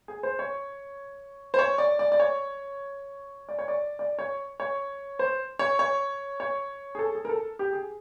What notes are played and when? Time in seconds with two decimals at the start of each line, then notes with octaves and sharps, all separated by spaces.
0.08 G#4
0.23 C5
0.39 C#5
1.54 C5
1.59 C#5
1.78 D5
1.99 D5
2.12 D5
2.20 C#5
3.49 D5
3.59 C#5
3.68 D5
3.99 D5
4.19 C#5
4.60 C#5
5.19 C5
5.59 C#5
5.79 C#5
6.40 C#5
6.95 G#4
6.99 A4
7.15 G#4
7.25 A#4
7.29 A4
7.59 G4
7.73 G#4